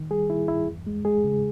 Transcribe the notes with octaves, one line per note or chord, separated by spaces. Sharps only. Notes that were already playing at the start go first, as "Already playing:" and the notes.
Already playing: D#3
G3 G#4
D#3 E4
G2 E4
E2
G#3
G#3 G#4
C#3